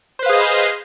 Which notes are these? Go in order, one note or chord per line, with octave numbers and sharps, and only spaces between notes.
G#4 B4 C5 D#5 F5